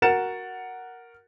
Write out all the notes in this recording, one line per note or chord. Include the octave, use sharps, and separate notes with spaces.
F#4 A#4 F#5 A6 C#7 E7